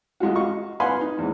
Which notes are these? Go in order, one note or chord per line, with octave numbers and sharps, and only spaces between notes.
A1 G#3 F4 F#4
F#4 D#5 F5 C#6
B4 F5 F#5 G#5 B5 C6
D#4
E2 G#2